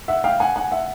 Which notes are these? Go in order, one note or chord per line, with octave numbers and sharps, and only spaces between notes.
E5 F#5
F5 G5
F#5 G#5
F#5 G#5
E5 F#5